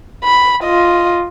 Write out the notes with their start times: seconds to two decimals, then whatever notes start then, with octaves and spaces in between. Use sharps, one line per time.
0.24 B5
0.63 F4 D#5